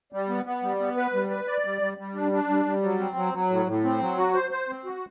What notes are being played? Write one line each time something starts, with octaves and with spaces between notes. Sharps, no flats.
G3
B3
B3
G3
B3
B4
G3
B4
D5
G3
G3
G3
D4
D4
G3
G3
F#3
C4
F#3
F#3
A2
A2
C4
F#3
F#4
C5
C5
C4
F#4